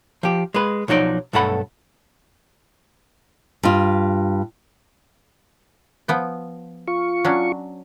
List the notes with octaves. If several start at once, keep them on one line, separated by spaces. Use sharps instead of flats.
F3 G4
G#3 B4
B1 F3 F#3 D#4 D5
B1 G2 A3 A4 F#5 B5
G2 F4
F3 B3 G5
F4 C#6
F#3 C#4 D4